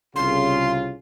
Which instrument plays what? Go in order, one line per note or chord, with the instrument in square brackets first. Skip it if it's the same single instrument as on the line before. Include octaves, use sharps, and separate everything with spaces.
[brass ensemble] C2 C#3 F4 [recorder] C6